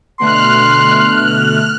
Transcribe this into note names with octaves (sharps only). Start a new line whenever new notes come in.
B2 D3 A3 C6 F6 F#6